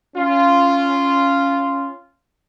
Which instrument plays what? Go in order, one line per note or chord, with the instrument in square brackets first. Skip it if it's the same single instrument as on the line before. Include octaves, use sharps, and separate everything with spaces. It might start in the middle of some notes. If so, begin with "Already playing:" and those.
[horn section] C#4 F4